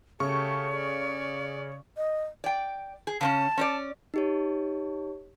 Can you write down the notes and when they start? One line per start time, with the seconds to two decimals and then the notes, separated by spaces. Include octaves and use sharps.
0.20 C#3 A3 G4 C#5 C#6
0.73 D5
1.97 D#5
2.44 D5 G5
3.07 G#4
3.21 C#3 B3 C#4 A5
3.57 C#4 D4 D5
4.14 D#4 G4 C#5